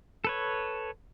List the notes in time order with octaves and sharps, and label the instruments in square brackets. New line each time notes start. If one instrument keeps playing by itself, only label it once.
[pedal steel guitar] A4 B4 C#5